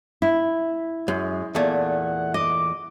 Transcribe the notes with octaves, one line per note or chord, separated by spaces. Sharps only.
E4
F#2 G#3
E2 A#2 A3 F#5
D#5 D6